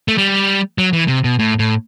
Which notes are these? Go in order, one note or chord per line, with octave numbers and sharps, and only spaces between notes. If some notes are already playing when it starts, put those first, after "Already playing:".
A3
G3
F#3
E3
C3
B2
A2
A2